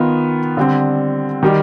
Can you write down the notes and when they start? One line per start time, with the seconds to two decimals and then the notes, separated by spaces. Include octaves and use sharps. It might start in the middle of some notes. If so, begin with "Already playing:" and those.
Already playing: D#3 B3 F4
0.57 D3 G3 C4
1.43 D#3 G3